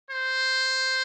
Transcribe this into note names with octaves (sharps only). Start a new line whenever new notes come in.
C5